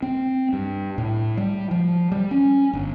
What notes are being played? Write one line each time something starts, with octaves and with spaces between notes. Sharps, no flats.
C4
G2
A2
G3
F3
G3
C#4
G1